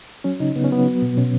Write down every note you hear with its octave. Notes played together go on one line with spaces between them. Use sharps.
F#3 C#4
C#3 D#4
C#3 B3
C#4
F#3 B3
F#3
B2
B2 C#4